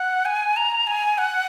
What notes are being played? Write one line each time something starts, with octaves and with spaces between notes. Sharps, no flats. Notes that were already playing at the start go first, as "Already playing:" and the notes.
Already playing: F#5
G#5
A#5
G#5
F#5